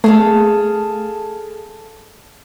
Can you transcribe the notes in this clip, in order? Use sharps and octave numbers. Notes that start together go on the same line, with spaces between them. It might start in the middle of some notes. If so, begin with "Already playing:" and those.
A3 G#4 A4 F5